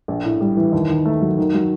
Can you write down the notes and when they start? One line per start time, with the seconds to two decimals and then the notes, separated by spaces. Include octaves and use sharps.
0.08 A#1
0.25 A2
0.41 G3
0.57 E3
0.73 D#2
0.89 D#3
1.05 A3
1.22 F#3
1.38 D#3
1.54 F#3